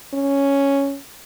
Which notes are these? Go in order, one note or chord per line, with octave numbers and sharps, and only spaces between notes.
C#4